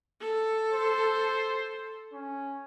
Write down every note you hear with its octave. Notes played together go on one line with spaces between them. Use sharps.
A4
C5
C#4